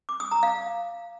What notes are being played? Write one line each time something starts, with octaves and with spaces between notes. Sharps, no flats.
D6
D#6
A#5
F5